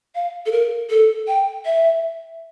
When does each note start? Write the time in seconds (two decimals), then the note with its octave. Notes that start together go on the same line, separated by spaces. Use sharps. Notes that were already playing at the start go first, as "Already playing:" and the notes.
0.15 F5
0.46 A4
0.52 A#4
0.90 A4
1.27 G5
1.65 E5